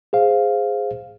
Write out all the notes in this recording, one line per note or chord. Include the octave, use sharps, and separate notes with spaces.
G#4 C5 F5